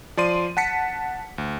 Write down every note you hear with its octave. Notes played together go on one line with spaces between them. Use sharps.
F3 D5 C6 D#7
F#5 A5 B6 C#7
D2